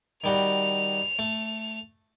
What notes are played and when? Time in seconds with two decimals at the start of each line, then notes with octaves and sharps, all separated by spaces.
0.24 D#3 G3 F#4 F7
1.19 A3